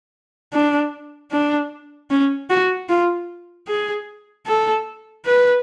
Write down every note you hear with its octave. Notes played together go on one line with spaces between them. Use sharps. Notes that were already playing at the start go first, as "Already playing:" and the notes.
D4
D4
C#4
F#4
F4
G#4
A4
B4